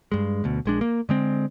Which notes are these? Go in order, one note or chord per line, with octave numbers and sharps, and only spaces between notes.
G2 G#3
D2 B2
A#1 G#3 D4
A#3
D3 G#3 C4